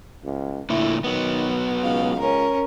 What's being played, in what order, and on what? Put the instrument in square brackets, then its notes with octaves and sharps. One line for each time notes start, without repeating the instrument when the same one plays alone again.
[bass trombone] C#2
[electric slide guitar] A#2 D3 A3 [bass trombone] E4
[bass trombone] D#3 [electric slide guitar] F#3 B3
[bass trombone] C#2 [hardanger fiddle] F5
[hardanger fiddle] C#4 A#4